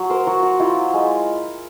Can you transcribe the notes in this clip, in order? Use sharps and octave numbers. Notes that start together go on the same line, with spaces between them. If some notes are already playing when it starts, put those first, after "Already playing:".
Already playing: F#3
A#4 C5
F#3 F#4
F#4
E4 F4 G4
G#3